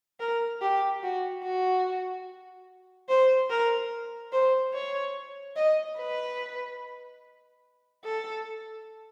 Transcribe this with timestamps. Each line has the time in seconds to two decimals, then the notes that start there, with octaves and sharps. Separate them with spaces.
0.20 A#4
0.61 G4
1.03 F#4
1.43 F#4
3.09 C5
3.50 A#4
4.32 C5
4.73 C#5
5.56 D#5
5.98 B4
8.04 A4